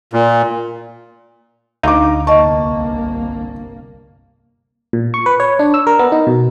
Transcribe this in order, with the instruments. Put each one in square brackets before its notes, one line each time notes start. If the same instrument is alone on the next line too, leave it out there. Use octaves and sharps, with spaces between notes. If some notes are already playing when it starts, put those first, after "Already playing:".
[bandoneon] A#2
[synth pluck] D2 D#4 [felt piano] F5 A#5 D6
[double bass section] G1 C2 A#3 [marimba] D#5 C#6 [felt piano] A5
[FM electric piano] A#2
C#6
B4
C#5
D4
E6
A#4
B3
D#4
B2